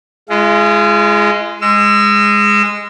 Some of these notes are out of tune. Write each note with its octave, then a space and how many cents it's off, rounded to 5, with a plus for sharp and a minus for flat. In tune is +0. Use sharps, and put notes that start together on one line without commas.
G#3 +5 F4 -40
G#3 -10 E6 +35